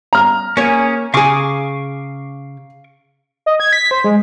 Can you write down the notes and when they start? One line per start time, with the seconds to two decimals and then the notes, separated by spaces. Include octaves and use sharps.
0.13 A#5 F6
0.57 A#3 C#4 G#4 C#5
1.14 C#3 G#4 F5 C#6 D6
3.46 D#5
3.60 G#6
3.73 B6
3.91 C5
4.04 G#3